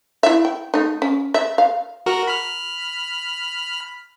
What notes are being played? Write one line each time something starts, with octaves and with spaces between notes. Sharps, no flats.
E4 E5
G5
A3 D#4
C#4
E5
F5
F#4 A#4
B5 F6